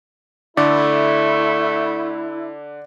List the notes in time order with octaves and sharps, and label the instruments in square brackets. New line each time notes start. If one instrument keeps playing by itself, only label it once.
[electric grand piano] D3 [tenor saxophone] A3 [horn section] E4 [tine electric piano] D5